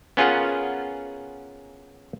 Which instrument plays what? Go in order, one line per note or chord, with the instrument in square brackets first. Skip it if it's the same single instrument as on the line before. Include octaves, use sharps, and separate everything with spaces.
[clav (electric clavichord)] B3 C#4 F4 G#4 A#4 F#5